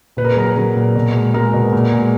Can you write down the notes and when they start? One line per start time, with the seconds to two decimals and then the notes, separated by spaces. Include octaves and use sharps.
0.17 A#2 B4
0.25 A#4
0.32 G#4
0.37 F#3 A#4
0.56 F#3
0.76 A#2
0.96 B2
1.15 G#3
1.34 G#3 A#4
1.54 B2
1.72 A#2
1.93 G#3